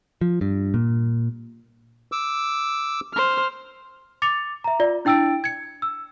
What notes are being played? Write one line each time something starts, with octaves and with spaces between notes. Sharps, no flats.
F3
G2
A#2
D6 E6
C5 F6
D6 A6 C#7 F7
E5 A#5
F4 D5
D4 E4 G5 E6 A6 D7
G#6 C#7
E6